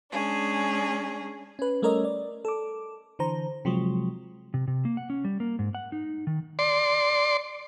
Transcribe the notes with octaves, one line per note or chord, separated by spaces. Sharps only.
G#3 C#4 D4 G#4
C#4 B4
G3 A3 C#4 A#4 C#5 D#5
D5
A4 D6
D3 E3 C5 A#5
C3 F3 F#3 G#3
C3
C3
A#3
F#5
C#4
G3
A#3
G#2
F#5
D#4
D#3
D5 C6